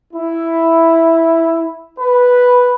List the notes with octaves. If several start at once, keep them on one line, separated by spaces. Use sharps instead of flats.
E4
B4